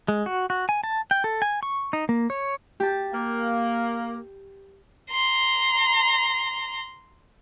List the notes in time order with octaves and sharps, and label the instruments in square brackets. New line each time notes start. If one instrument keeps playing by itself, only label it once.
[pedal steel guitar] G#3
F#4
F#4
G#5
A5
G5
A4
G#5
C#6
D#4
A#3
C#5
[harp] G4 A5
[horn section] A#3
[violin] A#5 C6